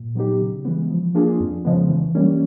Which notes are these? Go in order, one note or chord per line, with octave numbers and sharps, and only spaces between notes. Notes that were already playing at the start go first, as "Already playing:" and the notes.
Already playing: A#2
F#3 B3 D#4 G4
C#3
E3 G#3 B3
F3
A#3 D4 F4 G#4
F2
C#3 F3 G#3 B3
E3
G3 A#3 C#4